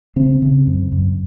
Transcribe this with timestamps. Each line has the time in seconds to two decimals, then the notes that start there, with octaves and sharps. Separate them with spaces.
0.16 C#3 C4
0.42 C#3
0.67 F#2
0.92 F#2